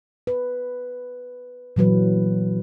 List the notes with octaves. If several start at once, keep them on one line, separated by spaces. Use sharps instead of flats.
B4
A#2 E3 F#3 B4